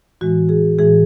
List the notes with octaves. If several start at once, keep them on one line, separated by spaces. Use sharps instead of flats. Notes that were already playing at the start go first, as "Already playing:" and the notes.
A2 E3 G#3 F#4
G#4
A2 E3 G#3 G#4